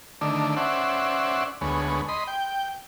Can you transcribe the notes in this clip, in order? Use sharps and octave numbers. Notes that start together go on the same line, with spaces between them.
D3 D#3 A3 D4
C#4 C5 D5 E5 F#5
D2 G#3 B3 C#5
D#5 B5 C6
G5